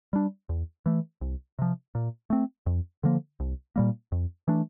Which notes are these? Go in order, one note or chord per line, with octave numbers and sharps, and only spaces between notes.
G3 D4
E2
E3 A3
C2
C3 F3
A#2
A3 C4
F2
D3 F3 A#3
C2
A#2 G3 A#3
F2
E3 A3 D4